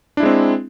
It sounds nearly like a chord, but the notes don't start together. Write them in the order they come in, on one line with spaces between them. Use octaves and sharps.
D4 E4 G#3 C4